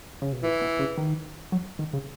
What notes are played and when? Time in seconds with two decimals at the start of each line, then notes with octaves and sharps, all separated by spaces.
0.22 C#3
0.33 B2
0.43 A#2 E3
0.61 B2
0.79 C#3
0.97 D#3
1.52 F#3
1.79 D#3
1.93 C#3